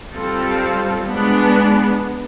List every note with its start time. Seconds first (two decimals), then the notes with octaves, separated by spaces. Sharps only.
0.16 G3 C4 F4 A4
1.08 G#3 B3 D4